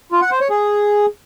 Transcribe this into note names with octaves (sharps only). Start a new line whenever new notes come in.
F4
F#5
C5
C#5
G#4